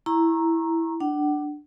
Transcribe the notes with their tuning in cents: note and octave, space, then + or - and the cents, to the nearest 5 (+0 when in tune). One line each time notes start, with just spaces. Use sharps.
E4 +0 A#5 +0 C#6 -30
D4 +10 F#5 +35